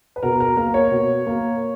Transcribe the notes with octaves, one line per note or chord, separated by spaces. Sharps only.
B4
B2 A#4
A#4
A#3 A#4
C#5
B2
A#3